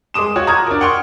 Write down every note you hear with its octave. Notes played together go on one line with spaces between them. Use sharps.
G#3 C6 D6 D#6 E7
F4 F#4 C#5
A#5 C#6 D#6 F6 F#6 G#6
D4 A#4
F#5 G5 C6 C#6 F6